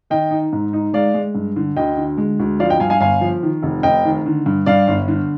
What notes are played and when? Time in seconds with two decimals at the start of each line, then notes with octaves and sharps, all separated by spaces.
0.10 D#3 D#5 G5
0.31 D#4
0.53 G#2
0.73 D#4
0.93 G#3 D5 F5
1.14 G#3
1.35 G2
1.56 D3
1.76 D2 D#5 G5
1.97 D3
2.17 G#3
2.39 D2
2.59 F3 D5 F5
2.69 D#5 G5
2.80 G2 F5 G#5
2.90 F5 G#5
3.00 G1 F5 G#5
3.21 F3
3.43 D#3
3.62 F1
3.83 F1 D#5 G5
4.05 D#3
4.26 D3
4.46 G2
4.66 G2 D5 F5
4.88 G1
5.08 D3